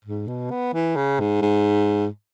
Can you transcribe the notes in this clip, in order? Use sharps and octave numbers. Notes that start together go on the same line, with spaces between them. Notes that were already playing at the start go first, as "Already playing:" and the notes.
G#2
B2
B3
E3
C#3
G#2
G#2